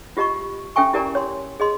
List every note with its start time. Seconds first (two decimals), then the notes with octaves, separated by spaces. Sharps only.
0.17 F4 G4 D#5 A#5 C#6
0.76 C#4 A4 E5 G5 G#5 C#6
0.93 E4 G4 A#4 D5 G#5 A#5
1.15 C#5 C6
1.60 G#4 D#5 C6